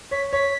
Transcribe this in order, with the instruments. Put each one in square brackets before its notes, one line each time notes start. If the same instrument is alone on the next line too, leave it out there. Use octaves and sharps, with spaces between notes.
[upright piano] C#5 [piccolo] B6
[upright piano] C#5 [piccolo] B6